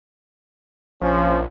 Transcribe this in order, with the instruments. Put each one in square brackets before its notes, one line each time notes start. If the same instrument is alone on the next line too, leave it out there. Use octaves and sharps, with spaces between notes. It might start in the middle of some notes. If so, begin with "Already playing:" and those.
[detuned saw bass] A#1 [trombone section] F3 C#4